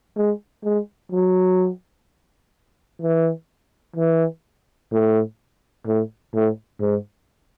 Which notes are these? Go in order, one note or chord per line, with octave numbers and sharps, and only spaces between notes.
G#3
G#3
F#3
E3
E3
A2
A2
A2
G#2